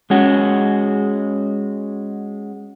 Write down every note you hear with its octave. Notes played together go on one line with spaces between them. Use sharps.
G#3 C#4 F#4